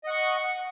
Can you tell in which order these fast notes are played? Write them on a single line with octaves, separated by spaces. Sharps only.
D#5 F#5 C#6